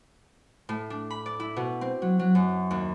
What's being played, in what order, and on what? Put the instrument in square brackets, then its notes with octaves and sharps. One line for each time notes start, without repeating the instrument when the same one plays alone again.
[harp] A2
D4
B5
D5
E4
B2
C4
F#3
F#3
F#2
D#2